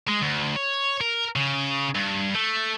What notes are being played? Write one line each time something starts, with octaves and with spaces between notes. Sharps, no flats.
G#3
D2
C#5
A#4
C#3
G2
A3